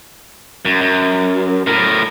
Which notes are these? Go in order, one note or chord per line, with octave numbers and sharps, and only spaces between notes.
F#2
F#2
A2 A#4